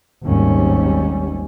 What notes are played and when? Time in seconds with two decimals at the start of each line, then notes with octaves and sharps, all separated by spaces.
0.23 G#1 D#2 G3 C#4